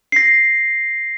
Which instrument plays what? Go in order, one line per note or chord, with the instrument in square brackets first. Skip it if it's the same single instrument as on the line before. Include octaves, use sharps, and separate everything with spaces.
[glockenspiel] A#6 C7